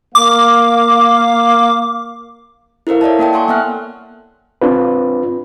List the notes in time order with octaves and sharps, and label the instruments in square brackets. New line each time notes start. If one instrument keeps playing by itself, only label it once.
[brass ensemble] A#3 F5 [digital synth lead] D6
[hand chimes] E4 A4 A#4 C5 F5
C#5 D5 E5 A5
A#3 A4 G5 A5
F#5 G#5 C6 C#6
A#3 B3 E5 F#5 F6 F#6
[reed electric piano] C4 D4 F4 B4